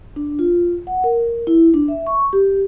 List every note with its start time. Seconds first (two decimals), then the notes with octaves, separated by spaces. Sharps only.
0.16 D4
0.39 F4
0.87 F#5
1.04 A#4
1.47 E4
1.74 D4
1.88 E5
2.07 C#6
2.33 G4